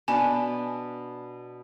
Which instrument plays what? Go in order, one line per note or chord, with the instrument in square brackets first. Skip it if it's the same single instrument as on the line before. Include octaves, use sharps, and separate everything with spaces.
[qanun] B2 D4 B4 [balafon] G#5